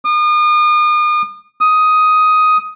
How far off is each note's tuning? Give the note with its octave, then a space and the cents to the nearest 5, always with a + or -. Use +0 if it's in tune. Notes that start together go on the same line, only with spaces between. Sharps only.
D#6 -40
D#6 +10